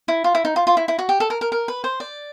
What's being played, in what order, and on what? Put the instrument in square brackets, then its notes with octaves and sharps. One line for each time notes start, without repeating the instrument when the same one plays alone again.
[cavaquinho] E4
F4
E4
D#4
F4
F4
E4
E4
F#4
G4
A4
A#4
A#4
A#4
B4
C5
D5